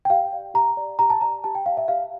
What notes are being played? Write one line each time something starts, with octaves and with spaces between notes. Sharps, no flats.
G5
G4 F5
D5
G4 A#5
D5
G4 A#5
A5
D5 A#5
G4 A5
G5
D5 F5
E5
G4 F5